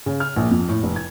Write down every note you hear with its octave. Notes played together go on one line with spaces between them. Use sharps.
C#3
F6
A#1
F2
A2
F1
G#6